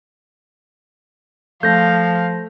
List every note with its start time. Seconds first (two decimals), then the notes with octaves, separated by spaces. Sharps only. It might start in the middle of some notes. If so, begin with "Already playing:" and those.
1.63 F3 A3 F5 G6 A#6